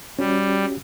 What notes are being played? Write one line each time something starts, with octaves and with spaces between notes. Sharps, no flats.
G3 C#4 F#4 G4